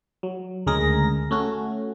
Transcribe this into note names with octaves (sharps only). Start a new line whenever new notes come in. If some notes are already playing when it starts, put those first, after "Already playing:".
F#3
D2 C#3 G#3 G#4 A#4 A#6
A3 C#4 F#4